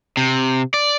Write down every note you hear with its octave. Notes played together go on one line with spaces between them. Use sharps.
C3
D5